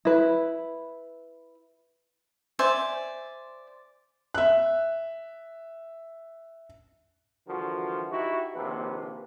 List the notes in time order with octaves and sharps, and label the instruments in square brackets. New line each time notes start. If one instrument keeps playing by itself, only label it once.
[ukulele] E4 B4
[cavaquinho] C5 D5 E5 G#5
[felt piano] E5 F#6
[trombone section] D3 E3 F3 G3 F#4 A#4
D#4 E4 F#4 G4
A#1 D#2 C3 D#3 B4